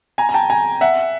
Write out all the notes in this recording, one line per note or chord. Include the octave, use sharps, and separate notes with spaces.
G#5 A#5
A#5
G5 A5
G#5 A#5
E5 F#5